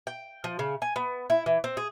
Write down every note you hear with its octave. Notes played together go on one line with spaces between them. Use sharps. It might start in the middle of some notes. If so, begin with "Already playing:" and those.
G5
F3
C#3
G#5
B3
E4
E3
C4
G#4